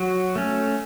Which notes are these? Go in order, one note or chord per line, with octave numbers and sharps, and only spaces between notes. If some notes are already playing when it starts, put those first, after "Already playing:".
Already playing: F#3 F#4
A3 C#4